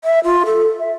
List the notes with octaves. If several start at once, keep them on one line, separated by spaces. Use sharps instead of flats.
E5
F4
A4
E5